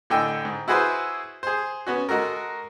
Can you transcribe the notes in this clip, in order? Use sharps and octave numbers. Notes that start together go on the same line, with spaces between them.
A2 D3 D#4 G5 G#5 E6
G#2
E4 F#4 G#4 B4 C5
G#4 C5
B3 C#4 F#4
G#3 F#4 A4 A#4